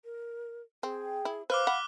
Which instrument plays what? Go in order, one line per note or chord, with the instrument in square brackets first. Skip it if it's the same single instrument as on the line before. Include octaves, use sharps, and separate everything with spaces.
[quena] A#4
[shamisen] C4 [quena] G#4 [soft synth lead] G5
[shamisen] E4
[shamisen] B4 [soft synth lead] C5 [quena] F5 [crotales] D6 F6 F#6
[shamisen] F#5 [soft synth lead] B5